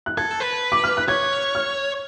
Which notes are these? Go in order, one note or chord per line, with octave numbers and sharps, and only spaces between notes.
F#6
A4 G#6
B4
D6
F6
F#6
C#5 G#6
F6